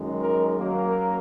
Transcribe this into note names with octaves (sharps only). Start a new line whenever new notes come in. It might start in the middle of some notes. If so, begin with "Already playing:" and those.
Already playing: F#2 D#3 G#3
A#4
F#2 F#3 A#3 A#4